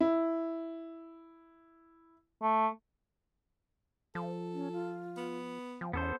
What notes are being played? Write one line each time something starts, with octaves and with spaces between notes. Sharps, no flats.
E4
A3
F3 A4
C#4
F4
B3
F3 G5
E2 B3 C#4 A4 C5